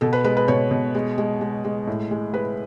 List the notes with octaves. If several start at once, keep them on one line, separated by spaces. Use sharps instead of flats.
B2 A4
B4
G#3 B4
B4
B2 C#5
B2
G#3
G#3
G#3
G#3
A2
G#3
G#3 B4